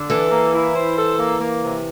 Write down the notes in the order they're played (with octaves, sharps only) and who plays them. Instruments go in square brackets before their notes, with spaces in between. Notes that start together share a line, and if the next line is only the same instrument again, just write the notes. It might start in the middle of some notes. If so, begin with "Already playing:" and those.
Already playing: [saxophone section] D3
[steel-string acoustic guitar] E3 [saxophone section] A4
[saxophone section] A#3
E4
C5
A4
A#3
A#3
C3